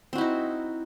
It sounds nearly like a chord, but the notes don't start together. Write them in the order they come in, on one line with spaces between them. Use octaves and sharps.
C4 F#4 E4 D#4